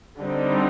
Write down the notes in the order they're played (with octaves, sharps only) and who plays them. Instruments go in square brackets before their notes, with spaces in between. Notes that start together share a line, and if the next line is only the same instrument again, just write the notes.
[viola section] D3 G3 C4 D#4